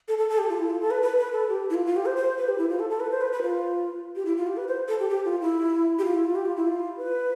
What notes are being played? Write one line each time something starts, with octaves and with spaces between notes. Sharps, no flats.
A4
A4
A4
G4
F4
E4
F4
A4
B4
B4
B4
A4
G4
E4
F4
F4
G4
C5
C5
B4
G4
E4
F4
A4
A4
B4
C5
B4
B4
F4
G4
E4
F4
G4
B4
C5
A4
G4
G4
F4
E4
G4
F4
E4
F4
G4
F4
E4
F4
B4